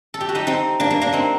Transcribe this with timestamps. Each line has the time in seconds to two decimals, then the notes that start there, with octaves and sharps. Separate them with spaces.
0.14 A4
0.21 G4
0.29 F#4
0.35 D#4 G4
0.47 C4 D#4
0.80 A#3 D4
0.90 A#3
1.01 A#3 D4
1.13 C4 D#4